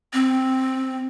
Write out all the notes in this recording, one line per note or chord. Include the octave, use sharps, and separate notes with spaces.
C4